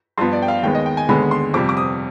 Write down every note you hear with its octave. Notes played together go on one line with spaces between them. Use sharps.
G2 F3 B3 C6
D5
G5
F5
D#2 D#3 G#3 B3 G5
D#5
G5
G#5
D#2 D3 G#3 B3 B5
C6
F2 C3 G3 D6
D6
D#6